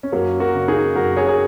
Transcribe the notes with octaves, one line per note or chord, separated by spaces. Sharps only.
C#4
F#2 F#3 A#3
F#4 A#4
C#3
D#4 G#4
F#2 F#4 A#4
G#4 C#5
G#4